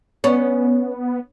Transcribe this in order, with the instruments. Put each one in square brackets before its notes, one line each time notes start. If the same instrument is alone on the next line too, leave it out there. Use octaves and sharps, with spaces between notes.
[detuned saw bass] B3 [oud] C#4